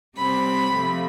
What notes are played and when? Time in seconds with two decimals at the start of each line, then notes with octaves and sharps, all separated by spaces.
0.17 C3 G3 C4 B5
0.73 C3 F3 A3